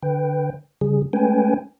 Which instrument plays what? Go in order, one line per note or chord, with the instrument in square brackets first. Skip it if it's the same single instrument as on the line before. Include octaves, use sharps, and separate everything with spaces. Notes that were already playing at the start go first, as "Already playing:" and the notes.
[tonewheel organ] D3 B4 G5
C#3 G3 G#4
G#3 A3 C#4 B4 G5 G#5